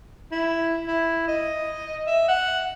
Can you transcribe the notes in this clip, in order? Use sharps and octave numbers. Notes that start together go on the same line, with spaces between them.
E4
E4
D#5
E5
F#5